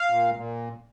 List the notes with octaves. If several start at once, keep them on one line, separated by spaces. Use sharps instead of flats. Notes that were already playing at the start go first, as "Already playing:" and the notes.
Already playing: F5
A#2
A#2